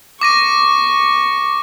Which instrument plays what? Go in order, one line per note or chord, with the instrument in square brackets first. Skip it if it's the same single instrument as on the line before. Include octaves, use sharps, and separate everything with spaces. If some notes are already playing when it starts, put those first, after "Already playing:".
[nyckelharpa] C#6 [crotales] D6 A#6 D#7